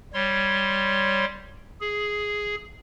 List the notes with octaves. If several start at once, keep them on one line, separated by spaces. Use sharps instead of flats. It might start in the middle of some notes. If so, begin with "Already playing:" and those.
G3 C#5 C6
G#4